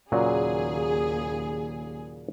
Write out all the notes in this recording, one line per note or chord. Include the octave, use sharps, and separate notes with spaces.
D#2 A#2 C#3 F#3 G#4